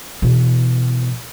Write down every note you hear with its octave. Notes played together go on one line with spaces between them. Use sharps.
B2 E3